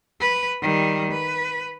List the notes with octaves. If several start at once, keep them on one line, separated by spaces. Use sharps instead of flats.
B4
D#3 G3
B4